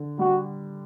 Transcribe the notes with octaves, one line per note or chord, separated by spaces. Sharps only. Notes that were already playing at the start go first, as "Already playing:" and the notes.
Already playing: D3
G3 F#4